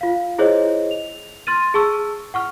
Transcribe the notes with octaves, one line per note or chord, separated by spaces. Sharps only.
F4 F5
E4 G#4 C5 C#5 D#5
F7
C6 F6 A6 D#7
G#4 A5 C#6 E6
F#5 C#6 F6